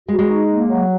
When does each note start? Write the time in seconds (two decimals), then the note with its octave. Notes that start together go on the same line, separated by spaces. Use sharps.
0.08 G#3 F#4
0.19 G#3
0.29 D#4
0.50 A#3
0.69 F#3